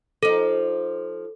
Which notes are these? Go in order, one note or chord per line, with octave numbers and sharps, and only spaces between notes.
F3 D#4 A4